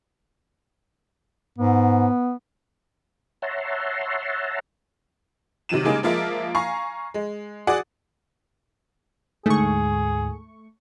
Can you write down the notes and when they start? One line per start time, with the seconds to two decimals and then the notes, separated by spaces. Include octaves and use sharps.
1.58 G#2 B3
3.42 C#5 E5 F#5 A5 A#5 C6
5.69 C3 D#3 F#3 D#7 E7
5.85 C#3 G3 G#3 A#3 D#4 G#4
6.03 F3 G#3 A#3 F4 A#4 E5
6.55 F5 G#5 A#5 C#6 C7
7.14 G#3
7.67 F#4 G#4 D5 F#5
9.46 D2 G#2 A3 G#4 C#6